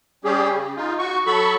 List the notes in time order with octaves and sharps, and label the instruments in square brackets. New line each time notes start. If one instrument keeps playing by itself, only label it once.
[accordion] G3 C#4 G4 G#4
C#3
D#4 F4
F#4 C#6
F#3 A4 B5 C#6